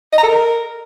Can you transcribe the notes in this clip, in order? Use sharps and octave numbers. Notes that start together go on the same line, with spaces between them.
D#5
A#5
A4
A#4